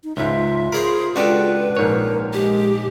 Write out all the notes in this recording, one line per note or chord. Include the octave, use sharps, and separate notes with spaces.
D#4
C#2 G#2 F4 E5
G#4 A#4 C5 C#5 B5
C#2 D4 F#4 G4 A4 B4
A#1 G#2 A#4 C#5
G#3 G4